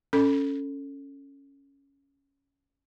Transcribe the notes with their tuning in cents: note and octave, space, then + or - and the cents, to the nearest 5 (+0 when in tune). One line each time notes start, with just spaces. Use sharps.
C#4 +0 A4 +15